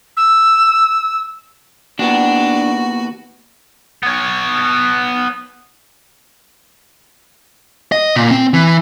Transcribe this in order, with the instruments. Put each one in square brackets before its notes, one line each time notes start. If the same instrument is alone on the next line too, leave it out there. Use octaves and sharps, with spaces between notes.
[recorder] E6
[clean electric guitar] D#2 B3 [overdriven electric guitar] D4 [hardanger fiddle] F#4
[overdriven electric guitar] B3 C#5
[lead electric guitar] D#5
A#2
C4
E3